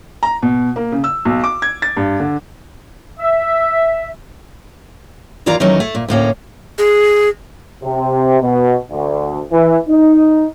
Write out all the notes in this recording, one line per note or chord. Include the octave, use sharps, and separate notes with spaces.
A#5
B2
A#3
C#3
E6
B1
D6
G#6
A6
G2
D3
E5
D#2 E3 F4 D5 A#5
D#3 E3 F#3 A3 C#4
A3
A#2
D2 A2 A#3 C#4
G#4
C3
B2
D2
E3
D#4